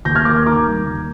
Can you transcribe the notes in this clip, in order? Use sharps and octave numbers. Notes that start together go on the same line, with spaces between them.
D#2 G6 A#6
F6 G#6
A#3 D6 F6
D#3 A#5 D6
G3
D#2